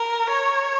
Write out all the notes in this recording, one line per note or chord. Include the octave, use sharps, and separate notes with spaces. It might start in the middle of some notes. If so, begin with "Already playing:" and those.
Already playing: A#4
C#5